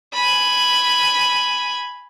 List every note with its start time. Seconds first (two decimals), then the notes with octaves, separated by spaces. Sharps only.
0.13 G#5 B5